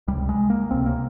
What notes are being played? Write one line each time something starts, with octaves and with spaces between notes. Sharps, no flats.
C#2 C3 G3
G#3
A#3
C#2 C3 C4
A#3